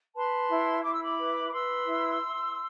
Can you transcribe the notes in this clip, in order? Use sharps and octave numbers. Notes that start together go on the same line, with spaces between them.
B4 A5 C6
E4
E4 D6
E6
B5 D6
B4
D6
B4 C6 E6
E4